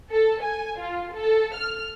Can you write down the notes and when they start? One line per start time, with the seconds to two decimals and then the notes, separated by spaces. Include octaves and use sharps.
0.10 A4
0.42 G#5
0.79 F4
1.13 A4
1.55 F6